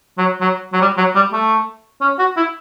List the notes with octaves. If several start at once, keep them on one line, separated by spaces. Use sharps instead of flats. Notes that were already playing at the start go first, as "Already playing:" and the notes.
F#3
F#3
F#3
G3
F#3
G3
A3
C#4
F#4
E4